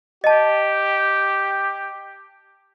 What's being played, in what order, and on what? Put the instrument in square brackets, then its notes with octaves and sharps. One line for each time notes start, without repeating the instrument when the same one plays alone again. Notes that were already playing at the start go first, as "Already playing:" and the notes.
[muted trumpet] G4 [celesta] D#5 A5